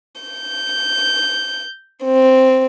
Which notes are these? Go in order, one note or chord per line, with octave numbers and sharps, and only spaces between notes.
G6
C4